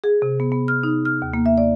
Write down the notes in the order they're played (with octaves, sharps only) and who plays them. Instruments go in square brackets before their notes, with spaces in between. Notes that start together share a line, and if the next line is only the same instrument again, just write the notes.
[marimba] G#4
C3
B3
B3
F6
D#4
F6
D#2
A#3
E5
D5